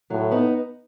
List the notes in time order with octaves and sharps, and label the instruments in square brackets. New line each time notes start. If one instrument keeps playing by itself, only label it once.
[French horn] A2 [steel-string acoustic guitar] F#3
[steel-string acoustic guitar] B3 D#4